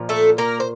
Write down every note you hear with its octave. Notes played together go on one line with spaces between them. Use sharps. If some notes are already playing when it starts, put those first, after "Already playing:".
Already playing: A#2 F3
A3 A4
A#3 A#4
C5